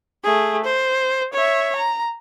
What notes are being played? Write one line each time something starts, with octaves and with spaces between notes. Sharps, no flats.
A3 G#4
C5
C#5 E5
A#5